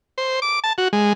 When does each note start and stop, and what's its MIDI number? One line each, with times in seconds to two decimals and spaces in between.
0.18 0.40 72
0.42 0.60 86
0.64 0.73 81
0.78 0.88 66
0.93 1.13 56